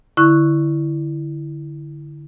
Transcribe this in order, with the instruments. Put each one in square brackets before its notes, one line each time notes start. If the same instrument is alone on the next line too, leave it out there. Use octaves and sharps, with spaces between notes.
[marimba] D3 E4 C#6 F#6